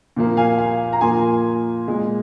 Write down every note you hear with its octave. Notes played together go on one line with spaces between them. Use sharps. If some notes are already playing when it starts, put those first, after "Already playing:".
A#2 F3 A#3
F5 G#5
F5 G#5
A#5
A#2 F3 A#3 G#5 C6
A#2 G#3